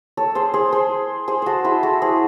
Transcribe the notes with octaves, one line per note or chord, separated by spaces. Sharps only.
A4 C#5
G#4 C5
G#4 C5
G#4 C5
G#4 C5
F#4 A4 C5
E4 G#4
F#4 A4
G#4 C5